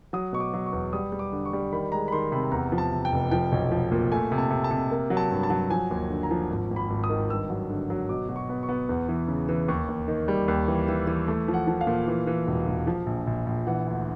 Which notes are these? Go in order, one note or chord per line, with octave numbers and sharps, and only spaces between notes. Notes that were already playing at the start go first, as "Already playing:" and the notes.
F#3 D#6
B2 C#6
D6
F#3
C#6
E2
G3 D#6
G3
D6
D3
C#6
G3
D#3 B5
G#3 A#5
B5
D#3 C6
C3 B5
E2 A#5
F3
A5
C3
G5
F1
F3 G5
B1
F3
A#2
A3 G#5
C3
A5
C3
A5
C3
A#3
F#3
A5
G2
A5
F#3
F3 G#5
D#2
D3
A#5
F3
G#1
G#1
B5
G#1
D#6
D#3
G2 E6
F#3
D3
F#3
B2 D6
B2
C#6
B3
C#6
B3
E2
E3
C#3
E3
D#2 C#6
D#2
D#3
G3
D#2
E3
E3
E3
A3
F3
F#5
F3
F5
A#2
E3
E3
E1
E1
F3
A#1
A#1
A#1
E3 F#5
D2